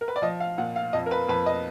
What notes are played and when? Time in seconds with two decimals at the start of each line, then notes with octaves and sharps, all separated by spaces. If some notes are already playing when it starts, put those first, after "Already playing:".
0.01 A#4
0.08 B4
0.16 D5
0.22 F3 D#5
0.40 F5
0.58 A#2 F#5
0.76 F5
0.93 F2 D#5
1.06 A#4
1.11 B4
1.28 F2 B4
1.46 D#5